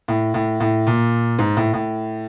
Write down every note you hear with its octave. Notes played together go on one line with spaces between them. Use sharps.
A2
A2
A2
A#2
G#2
A2
A2